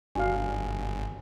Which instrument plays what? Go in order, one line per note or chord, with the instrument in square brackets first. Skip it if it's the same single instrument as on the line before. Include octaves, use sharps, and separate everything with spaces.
[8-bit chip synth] G1 [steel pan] D4 F#4 F5 [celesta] G#5